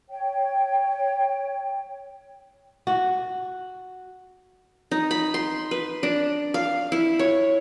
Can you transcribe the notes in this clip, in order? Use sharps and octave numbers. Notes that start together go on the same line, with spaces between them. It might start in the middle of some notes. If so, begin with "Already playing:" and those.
C#5 G5
F#4
D#4
B5
C6
B4
D4
F5
E4
C#5